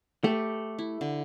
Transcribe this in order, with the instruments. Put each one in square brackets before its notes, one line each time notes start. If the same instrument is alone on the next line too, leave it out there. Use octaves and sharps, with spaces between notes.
[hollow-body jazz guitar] A3 [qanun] G4 B4
[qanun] E4
D3